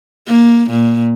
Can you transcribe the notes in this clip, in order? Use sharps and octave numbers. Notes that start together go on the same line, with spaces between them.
A#3
A#2